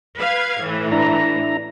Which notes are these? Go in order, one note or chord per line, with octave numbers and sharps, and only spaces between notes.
B4 F5 G#6
A2 E3
D4 E4 A#5